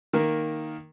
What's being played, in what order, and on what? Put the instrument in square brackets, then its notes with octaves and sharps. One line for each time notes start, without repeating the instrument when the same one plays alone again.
[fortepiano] D#3 A#3